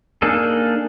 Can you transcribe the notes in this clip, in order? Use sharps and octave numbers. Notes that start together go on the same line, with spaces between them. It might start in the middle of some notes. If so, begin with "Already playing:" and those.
A#3 D4 D#4 G#4 A4